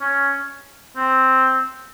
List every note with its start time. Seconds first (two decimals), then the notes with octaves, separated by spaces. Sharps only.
0.01 C#4
0.96 C4